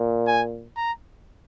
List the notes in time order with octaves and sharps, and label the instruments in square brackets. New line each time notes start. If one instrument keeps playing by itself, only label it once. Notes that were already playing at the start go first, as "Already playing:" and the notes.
Already playing: [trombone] A#2
[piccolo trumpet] G#5
A#5